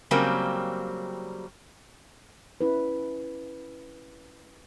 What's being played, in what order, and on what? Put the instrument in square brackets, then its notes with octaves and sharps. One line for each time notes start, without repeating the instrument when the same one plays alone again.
[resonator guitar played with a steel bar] C#3 F#3 G3 A#3 C4
[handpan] C#4 E4 B4